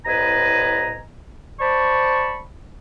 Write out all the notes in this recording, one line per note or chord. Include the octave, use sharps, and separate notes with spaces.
C2 A2 B4 D#5 G#5 A#5
C5 D5 A5 B5 C#6